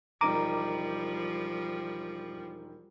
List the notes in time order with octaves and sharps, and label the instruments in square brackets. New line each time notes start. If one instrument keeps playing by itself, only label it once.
[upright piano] E1 D#3 D#7 [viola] F3 G3 [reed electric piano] A#5 D6